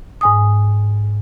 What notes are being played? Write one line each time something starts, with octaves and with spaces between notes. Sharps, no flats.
G#2 G#5 D#6